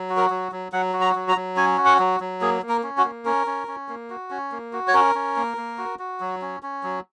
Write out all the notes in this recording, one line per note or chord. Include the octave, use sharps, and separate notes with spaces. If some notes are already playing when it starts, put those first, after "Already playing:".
Already playing: F#3
F#4
A#4
F#3
F#3
F#3 F#5
F#4
A#5
F#3
A#5
F#3
C#4 G#5
F#4
F#5
F#3
F#3
A#3 G#4
A#3
A#4
C#4
F#4
A#3
C#4 A#4
C#4
C#4
A#3
F#4
C#4
A#3
F#4
C#5
C#4 A#4
C#4
A#3
A#3
F#4
F#4
F#3
C#4
C#4
F#3